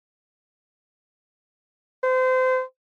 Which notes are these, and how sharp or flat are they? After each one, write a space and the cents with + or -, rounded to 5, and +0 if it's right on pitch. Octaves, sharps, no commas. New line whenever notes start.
C5 -30